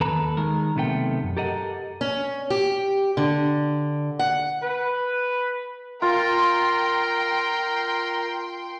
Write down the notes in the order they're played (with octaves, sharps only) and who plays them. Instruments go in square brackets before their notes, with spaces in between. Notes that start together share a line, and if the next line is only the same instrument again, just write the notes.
[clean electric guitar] D#2 A4 B4 A#5
D#3 G#3 A#4
B1 C3 D#3 A3 B3 G5
F#2
G4 A4 A#4 D#5 F#5
[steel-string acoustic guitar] C#4
G4
D3
F#5
[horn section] B4
[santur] F4 [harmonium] A#4 A#5 [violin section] G5 C6